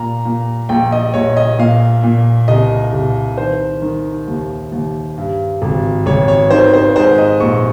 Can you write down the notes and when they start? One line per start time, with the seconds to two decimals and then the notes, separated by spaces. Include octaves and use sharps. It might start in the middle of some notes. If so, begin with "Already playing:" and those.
Already playing: A#2 A#5
0.25 A#2
0.69 A#1 G5
0.92 D#5
1.14 A#1 C#5
1.37 D#5
1.59 A#2 F5
2.03 A#2
2.48 C2 D#5
2.93 C2
3.37 D#3 C5
3.82 D#3
4.28 D#2
4.72 D#2
5.17 G2
5.62 G#1
6.06 G#1 C#5
6.28 C#5
6.50 D#3 C5
6.74 C5
6.96 G#2 C5
7.18 D#5
7.40 A#1 C#6